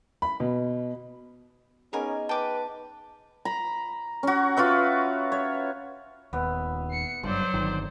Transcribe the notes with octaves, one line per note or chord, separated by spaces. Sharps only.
B5
B2
B3 C#4 D#4 G#4 A#4 G#5
B4 G5 A5 D6
A#5 B5
C#4 F#4
F4 F#4 B4 E5
C#5
D#1 D#2 B3 E5
C7 C#7
F#1 G2 F#3 C5 D5 C6
G1 D#3